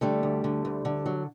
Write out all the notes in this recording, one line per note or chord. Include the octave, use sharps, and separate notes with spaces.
D3 G3 A3
D2
D3
D2
D3
F#3